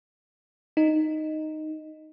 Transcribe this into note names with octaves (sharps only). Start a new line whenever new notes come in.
D#4